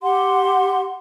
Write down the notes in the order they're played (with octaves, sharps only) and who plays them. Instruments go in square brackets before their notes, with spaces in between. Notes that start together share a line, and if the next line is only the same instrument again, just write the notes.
[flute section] G4 F#5 C6